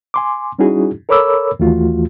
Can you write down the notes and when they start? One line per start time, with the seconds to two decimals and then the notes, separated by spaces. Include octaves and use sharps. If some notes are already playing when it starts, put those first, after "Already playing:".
0.14 G#5 C6 D6
0.59 G3 C#4 D#4 E4 F#4 G#4
1.09 A4 A#4 C#5 B5 D6 E6
1.59 D#2 E3 A3 F4 F#4